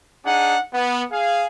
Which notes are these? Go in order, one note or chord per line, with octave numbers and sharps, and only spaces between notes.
D4 D#4 G#4 F#5
B3
G#4 F5